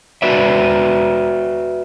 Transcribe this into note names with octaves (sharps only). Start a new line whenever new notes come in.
F#4 B4 D5 E5